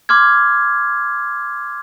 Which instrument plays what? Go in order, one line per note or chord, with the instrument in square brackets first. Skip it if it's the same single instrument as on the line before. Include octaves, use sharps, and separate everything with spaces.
[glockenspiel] C6 D6 F6 G#6